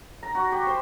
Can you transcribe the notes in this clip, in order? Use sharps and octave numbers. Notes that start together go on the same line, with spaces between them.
A#5
F#4
G4
C5